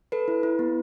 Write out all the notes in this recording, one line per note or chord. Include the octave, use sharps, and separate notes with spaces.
A4 B4
E4
E4
B3